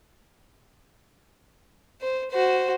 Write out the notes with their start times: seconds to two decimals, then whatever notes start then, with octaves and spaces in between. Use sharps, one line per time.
2.01 C5
2.31 F#4 C5